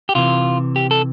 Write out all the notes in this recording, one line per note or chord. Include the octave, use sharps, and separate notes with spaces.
G4
C3 E3 F4
G4
A4